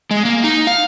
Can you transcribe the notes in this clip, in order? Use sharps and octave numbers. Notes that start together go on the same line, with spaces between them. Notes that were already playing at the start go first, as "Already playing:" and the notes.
G#3
A#3
D#4
F5